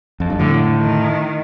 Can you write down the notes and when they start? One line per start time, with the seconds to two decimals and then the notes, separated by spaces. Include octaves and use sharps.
0.20 F2
0.30 G2
0.39 A2 D3
0.75 D#3